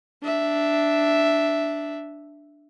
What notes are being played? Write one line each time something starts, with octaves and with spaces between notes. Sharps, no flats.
D4 E5